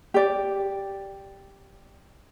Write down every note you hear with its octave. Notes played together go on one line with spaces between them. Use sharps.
G4 D5